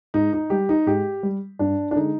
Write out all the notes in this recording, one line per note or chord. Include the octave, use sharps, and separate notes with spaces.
G#2 D#4
D#4
G3 G4
D#4
G#2 G4
G3
G2 D4
D4
D3 G#3 D#4